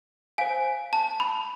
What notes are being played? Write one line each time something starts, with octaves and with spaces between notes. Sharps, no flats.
C5 F5 G#5
A5
B5